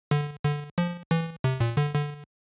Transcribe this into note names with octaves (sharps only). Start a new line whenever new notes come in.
D3
D3
F3
E3
C3
A#2
D3
D3